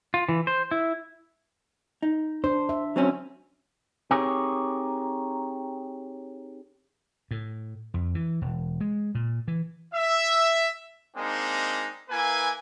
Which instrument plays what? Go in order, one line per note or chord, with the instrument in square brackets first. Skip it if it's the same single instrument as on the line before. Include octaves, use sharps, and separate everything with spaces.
[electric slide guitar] F4
E3
C5
E4
[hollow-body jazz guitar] D#4
[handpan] D4 [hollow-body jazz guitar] C5
[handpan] E5
[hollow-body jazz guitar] F#3 C4 C#4
[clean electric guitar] C4 D#4 G4 G#4 A#4 C#5
[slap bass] A2
F2
E3
E1
G#3
A#2
E3
[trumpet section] E5
G#3 A#3 C4 D4 D#4
A#3 E4 B4 G#5